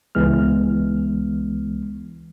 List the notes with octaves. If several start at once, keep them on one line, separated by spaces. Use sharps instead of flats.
C#2 E3 G#3 B3 F6